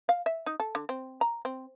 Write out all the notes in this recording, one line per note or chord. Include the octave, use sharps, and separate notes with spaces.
F5
E5
D#4
A4
D3
C4
A#5
C4